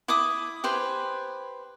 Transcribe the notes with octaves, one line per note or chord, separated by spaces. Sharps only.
E4 D6 D#6
G4 B4 C5 G#5